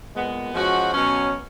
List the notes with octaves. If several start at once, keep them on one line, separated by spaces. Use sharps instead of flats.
A#2 G#3 B3
F3 G#3 C#4 F#4
B2 F#3 C#4